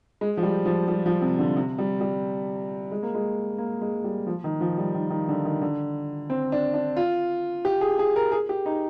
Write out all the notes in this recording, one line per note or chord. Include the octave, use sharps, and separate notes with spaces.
G#3
F3
G3
F3
G3
F3
C3
D3
C3
G3
G3
G#3
A#3
G#3
A#3
G#3
G3
F3
D#3
F3
G3
D#3
D#3
D3
D#3
D3
C4
D4
D4
F4
G4
G#4
G#4
A#4
G#4
G4
D#4